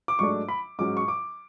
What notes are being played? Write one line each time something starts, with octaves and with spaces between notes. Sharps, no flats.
D6
G#2 F#3 A3 D4 C#6
B5
G#2 F#3 C#4 D6
C#6
D6